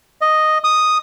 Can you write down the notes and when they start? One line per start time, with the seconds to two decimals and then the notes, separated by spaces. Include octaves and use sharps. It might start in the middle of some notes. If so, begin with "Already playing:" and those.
0.21 D#5
0.64 D#6